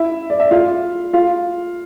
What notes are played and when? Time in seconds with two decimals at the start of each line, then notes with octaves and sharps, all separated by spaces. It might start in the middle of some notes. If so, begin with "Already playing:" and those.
Already playing: E4 E5
0.30 D5
0.40 E5
0.51 F4 F5
1.13 F4 F5